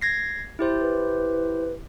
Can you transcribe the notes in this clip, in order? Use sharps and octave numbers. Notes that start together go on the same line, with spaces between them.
G#6 A#6 C7
E4 G4 C5
B4